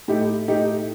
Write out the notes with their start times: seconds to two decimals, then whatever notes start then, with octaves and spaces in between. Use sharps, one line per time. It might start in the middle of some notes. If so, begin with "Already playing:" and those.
0.08 A2 A3 D#4 G4
0.48 A2 A3 D#4 G4